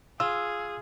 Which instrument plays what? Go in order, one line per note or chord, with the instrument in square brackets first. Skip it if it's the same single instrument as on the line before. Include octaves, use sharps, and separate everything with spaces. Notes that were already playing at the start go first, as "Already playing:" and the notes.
[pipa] F4 [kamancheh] G#4 [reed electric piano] E6